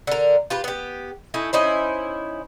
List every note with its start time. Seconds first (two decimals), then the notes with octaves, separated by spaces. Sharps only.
0.07 D3 A#4
0.50 F4 G4 B4
0.64 B3 G4
1.34 A3 D#4 E4 G#5
1.53 C#4 D#4 E4 C5